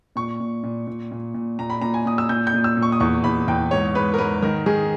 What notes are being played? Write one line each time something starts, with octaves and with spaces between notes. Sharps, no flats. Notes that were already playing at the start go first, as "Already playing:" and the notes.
A#2 C#6
A#2
A#2
A#2
A#2
A#2
A#2 A#5
B5
A#2 A#5
G#5
A#2 D#6
E6
A#2 G6
G6
A#2
E6
A#2
C#6
D#6
E2 C#6
E2 B5
E2 G5
G#2 C#5
G#2 B4
A#4
G#2 B4
D#3 A#4
D#3 G#4